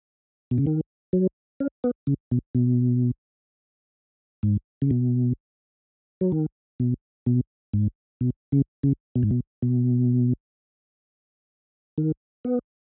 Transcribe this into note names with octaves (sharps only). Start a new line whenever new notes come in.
B2
C#3
D#3
F#3
C#4
B3
C#3
B2
B2
G#2
C#3
B2
F#3
D#3
B2
B2
G#2
B2
C#3
C#3
B2
G#2
B2
B2
D#3
B3